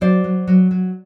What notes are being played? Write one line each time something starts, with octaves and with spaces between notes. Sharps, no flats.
F#3 C5 D5
F#3
F#3
F#3